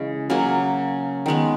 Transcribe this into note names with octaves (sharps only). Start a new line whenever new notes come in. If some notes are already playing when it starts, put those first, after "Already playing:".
Already playing: C#3 E3 G#3
C#3 F#3 A#3
D#3 G#3 B3